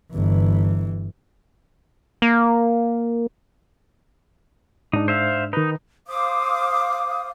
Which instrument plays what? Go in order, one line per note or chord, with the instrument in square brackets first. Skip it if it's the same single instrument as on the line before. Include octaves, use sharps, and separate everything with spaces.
[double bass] G1 E3
[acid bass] A#3
[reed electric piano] G#2 D4 [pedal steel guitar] D#4
[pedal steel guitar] C5 E5 F5
[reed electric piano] D#3 B4 [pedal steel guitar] D#4
[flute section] C5 F5 D6 D#6